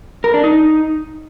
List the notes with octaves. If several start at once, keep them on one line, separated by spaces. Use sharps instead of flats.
A#4
D4
D#4